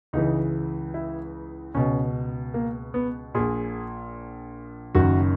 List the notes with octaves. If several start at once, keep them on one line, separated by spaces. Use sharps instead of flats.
C#2 C#3 E3 D#4
E4
C#2 B2 C#4
A#3
B3
A#1 A#2 G#4
F#1 F#2 D#3 F#4